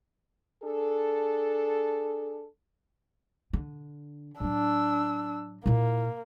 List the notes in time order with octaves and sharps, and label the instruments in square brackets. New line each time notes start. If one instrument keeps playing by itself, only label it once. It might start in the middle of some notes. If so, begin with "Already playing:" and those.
[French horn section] D4 G#4 A4
[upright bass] D3
[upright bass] A2 F#3 [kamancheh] D4 E6
[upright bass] A#2 E4 [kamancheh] A#3